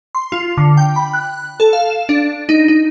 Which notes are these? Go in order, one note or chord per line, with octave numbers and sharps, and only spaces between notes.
C6
F4
D3
G5
B5
F#6
A4
F5
E7
D4
D#4
D#4